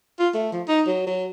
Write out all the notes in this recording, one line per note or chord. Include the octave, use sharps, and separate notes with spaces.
F4
A3
F3
D#4
F#3
F#3